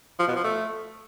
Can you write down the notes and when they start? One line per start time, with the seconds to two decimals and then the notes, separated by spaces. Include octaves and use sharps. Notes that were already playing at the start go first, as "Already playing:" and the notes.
0.19 F3
0.28 B2
0.36 F3
0.44 A3